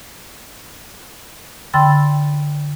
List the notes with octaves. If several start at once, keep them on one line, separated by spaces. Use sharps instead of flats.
D3 G5 B5 C6 E6 A6